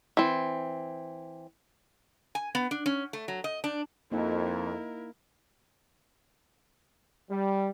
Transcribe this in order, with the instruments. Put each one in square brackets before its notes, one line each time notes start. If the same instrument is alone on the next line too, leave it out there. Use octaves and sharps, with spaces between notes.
[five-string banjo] E3 C4
[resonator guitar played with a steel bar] G#5
B3
D4
C#4
A3
F#3
D#5
D4
[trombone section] F2 [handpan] A#3 D#4 [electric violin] E4 A#4
[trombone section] G3